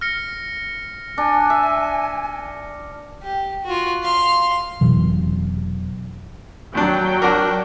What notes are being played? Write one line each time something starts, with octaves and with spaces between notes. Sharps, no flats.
F6 A#6 C#7
D4 G#5
E5
G4
F4 F#4
F5 C6
F1 B2 E3 F#3
D#2 F#3 D4 G5
D4 F#4 A#4